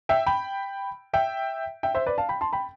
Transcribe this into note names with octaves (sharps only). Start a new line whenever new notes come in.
E5 G5
G5 B5
E5 G5
E5 G5
C5 E5
B4 D5
F5 A5
G5 B5
A5 C6
G5 B5